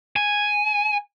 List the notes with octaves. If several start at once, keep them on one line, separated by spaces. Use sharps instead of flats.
G#5